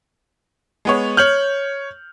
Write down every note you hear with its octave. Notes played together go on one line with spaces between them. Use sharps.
G#3 B3 C#5
C#5 F6 G6 F#7